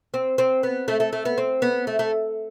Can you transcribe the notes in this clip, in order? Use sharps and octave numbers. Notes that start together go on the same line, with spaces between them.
C4
C4
B3
A3
A3
A3
B3
C4
B3
A3
A3